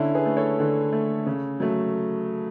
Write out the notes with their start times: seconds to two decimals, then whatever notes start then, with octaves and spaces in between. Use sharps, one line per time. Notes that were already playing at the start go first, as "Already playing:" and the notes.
Already playing: D3 C#4 E4
0.15 G#4 B4
0.26 A3
0.37 A4 C#5
0.60 D3
0.93 A3
1.26 C#3
1.60 F#3 A3